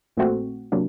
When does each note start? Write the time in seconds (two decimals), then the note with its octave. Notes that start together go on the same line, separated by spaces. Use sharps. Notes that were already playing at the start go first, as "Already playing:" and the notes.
0.17 A#1 A#2 A3 C4 F#4
0.72 C3 F#3 A#3 D4